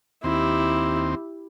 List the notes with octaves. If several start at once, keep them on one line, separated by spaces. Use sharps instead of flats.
D#2 C4 E4 G4